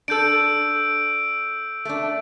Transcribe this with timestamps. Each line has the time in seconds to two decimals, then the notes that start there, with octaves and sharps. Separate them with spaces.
0.08 D4 A4 E6 G6 D7
1.85 A3 D4